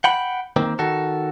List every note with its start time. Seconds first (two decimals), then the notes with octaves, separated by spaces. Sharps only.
0.04 F#5 G5 B5
0.56 D#3 A#3 C4
0.79 D#3 F#4 A4